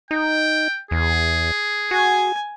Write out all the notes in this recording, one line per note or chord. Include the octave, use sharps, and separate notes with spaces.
D#4 G5
E2 G#4
F#4 G#5